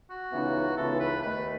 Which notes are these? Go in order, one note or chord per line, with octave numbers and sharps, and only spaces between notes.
F#4
C#2 C#3 E3 B3 D#4
C#2 C#3 E3 B3 D#4 A4
B4
D#2 D#3 A3 B4